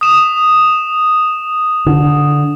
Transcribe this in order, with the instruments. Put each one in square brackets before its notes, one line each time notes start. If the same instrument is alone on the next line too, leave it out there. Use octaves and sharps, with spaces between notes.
[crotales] D#6 E7
[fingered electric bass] D3